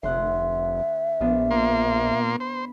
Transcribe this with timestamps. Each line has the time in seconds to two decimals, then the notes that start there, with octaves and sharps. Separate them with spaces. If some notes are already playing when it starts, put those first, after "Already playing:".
0.03 F1 D2 E5 F#5 C6
1.21 A#1 B3 D4 F4
1.51 A#2 A#3 C6
2.40 C5 B5